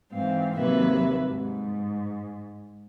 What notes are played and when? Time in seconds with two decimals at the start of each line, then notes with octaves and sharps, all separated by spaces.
0.12 G#2 E3 C4 F5
0.57 D#2 C3 F#3 A#3 B4 E5
1.27 G#2